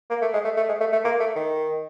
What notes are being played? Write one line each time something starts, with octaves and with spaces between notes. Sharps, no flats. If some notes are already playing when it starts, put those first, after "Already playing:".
A#3
A3
G#3
A3
A3
G#3
A3
A3
A#3
A3
D#3